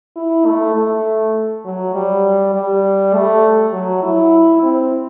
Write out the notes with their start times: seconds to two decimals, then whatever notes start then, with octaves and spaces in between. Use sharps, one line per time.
0.16 E4
0.46 A3
0.76 A3
1.65 F#3
1.94 G3
2.55 G3
3.14 A3
3.72 F#3
4.03 E4
4.63 C4